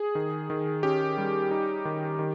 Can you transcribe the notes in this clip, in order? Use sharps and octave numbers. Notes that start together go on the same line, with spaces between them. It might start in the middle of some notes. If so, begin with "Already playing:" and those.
Already playing: G#4
D#3
D#3
C#4 G4
G3
D#4
D#3
D#3